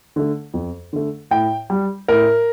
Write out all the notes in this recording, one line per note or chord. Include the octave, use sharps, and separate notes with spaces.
D3 A3
F2
D3 A3
A2 G5
G3
A2 A#4